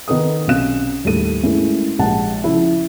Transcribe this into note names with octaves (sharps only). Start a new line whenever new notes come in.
D#3 B3 D#4 A4 D#6
B1 C3 C#4 F5 F#6 E7
D#2 A2 G3 A4 D#7
G#2 A3 A#3 C#4 E4
A#1 G#2 G4 F#5 A5
C#3 F3 E4